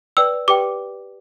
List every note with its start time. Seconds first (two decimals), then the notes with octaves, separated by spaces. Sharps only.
0.17 B4 D5 G5 E6
0.48 G4 B4 D5 G5 D6